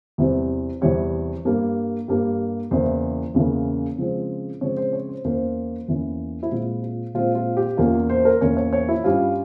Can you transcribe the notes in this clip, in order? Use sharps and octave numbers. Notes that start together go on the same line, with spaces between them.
E2 C3 E3 G3 C4
E2 C3 E3 G3 C4 C#5
G2 G3 A#3
G2 G3 A#3
E2 C#3 E3 A#3 C5
E2 C#3 E3 A#3
C#3 F3 G#3 C4
C#3 F3 G#3 C4 C#5
C5
C#5
C5
E2 E3 A#3 C#4 C5
E2 E3 A#3 C#4
E4
A#2 G#3 C4 F4
F4
A#2 G#3 C4 F4
F4
G4
E2 E3 A#3 C#4 F4
C5
A#4
E2 E3 A#3 C#4 C#5
C#5
C#5
E4
G2 G3 C#4 F4